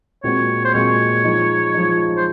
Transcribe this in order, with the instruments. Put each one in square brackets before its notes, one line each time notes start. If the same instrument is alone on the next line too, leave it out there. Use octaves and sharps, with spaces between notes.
[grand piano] A#2 G#3 C4 F#4 [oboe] C#5
[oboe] C5
[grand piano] A#2 G#3 C4 F#4 [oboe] C#5
[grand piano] F3 G#3 D#4
F3 G#3 D#4
[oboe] C5